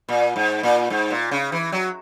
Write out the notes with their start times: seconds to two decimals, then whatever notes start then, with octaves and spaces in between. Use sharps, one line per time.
0.09 A#2
0.36 G#2
0.63 A#2
0.90 G#2
1.10 A#2
1.31 C#3
1.52 E3
1.72 F#3